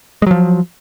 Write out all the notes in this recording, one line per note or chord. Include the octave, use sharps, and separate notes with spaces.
F3 F#3 G#3